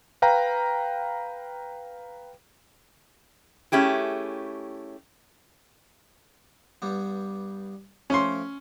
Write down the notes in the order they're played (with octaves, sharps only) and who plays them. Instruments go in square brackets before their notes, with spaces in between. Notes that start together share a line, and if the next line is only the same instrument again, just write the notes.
[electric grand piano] B4 F5 G5 A#5
[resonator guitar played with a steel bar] A3 C#4 E4 G4 G#4
[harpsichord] G2 G3 B3
[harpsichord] F3 A3 G5 [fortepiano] C#4 C6